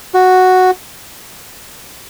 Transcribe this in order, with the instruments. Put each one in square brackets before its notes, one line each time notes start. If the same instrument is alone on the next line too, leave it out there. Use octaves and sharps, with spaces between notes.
[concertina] F#4